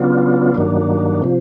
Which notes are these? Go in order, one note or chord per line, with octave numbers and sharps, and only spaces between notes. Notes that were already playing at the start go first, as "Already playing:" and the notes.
Already playing: C#3 F#3 B3 D4 F4
G2 D#3 F#3 A#3 D4
C3 F3